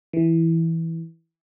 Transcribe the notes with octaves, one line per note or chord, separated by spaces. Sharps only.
E3